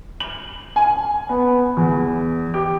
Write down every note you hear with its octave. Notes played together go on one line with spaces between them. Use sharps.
F#7
G#5
B3
E2
G4